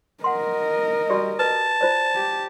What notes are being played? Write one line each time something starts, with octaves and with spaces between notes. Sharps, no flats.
A#4 D#5 F#5 C6
G3 F#4 G4 D5
B4 A5
F4 C5 D5
G4